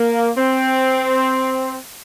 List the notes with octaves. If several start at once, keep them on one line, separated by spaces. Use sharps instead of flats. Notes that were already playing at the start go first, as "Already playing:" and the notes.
Already playing: A#3
C4